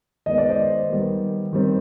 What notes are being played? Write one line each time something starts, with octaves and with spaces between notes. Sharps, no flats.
D#3 G#3 B3 D#5
D5
C5 D#5
D#3 G3 B3
D#3 G3 C4